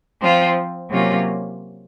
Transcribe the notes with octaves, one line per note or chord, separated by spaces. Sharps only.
F3 C4 F4
C3 F#3 A#3 C#4 F4